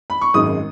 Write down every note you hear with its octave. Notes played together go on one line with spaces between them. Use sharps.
B5
C#6
G#1 F#2 D#3 G#3 D#4 D#6